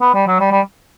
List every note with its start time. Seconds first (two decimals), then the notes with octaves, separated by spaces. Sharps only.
0.01 B3
0.14 G3
0.27 F#3
0.40 G3
0.51 G3